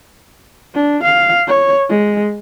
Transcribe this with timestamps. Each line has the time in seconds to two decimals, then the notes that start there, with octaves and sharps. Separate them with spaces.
0.74 D4
1.03 F5
1.47 C#5
1.89 G#3